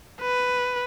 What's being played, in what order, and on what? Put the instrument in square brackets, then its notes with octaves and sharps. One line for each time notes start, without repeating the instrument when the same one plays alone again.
[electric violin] B4